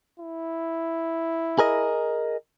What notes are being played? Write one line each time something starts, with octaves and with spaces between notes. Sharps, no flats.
E4
G#4 A#4 D#5